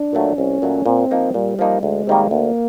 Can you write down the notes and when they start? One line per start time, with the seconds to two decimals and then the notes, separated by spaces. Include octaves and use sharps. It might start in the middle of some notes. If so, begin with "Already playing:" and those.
Already playing: D4
0.13 A#2 F#3 A3
0.37 C2 C#4
0.62 A#2 F#3 A3
0.86 A#2 C4
1.11 F3 A#3 D#4
1.34 A#2 G3
1.59 F3 A#3 D#4
1.83 D2 G#3
2.07 C3 D#3 G3 A#3
2.31 D2 A#3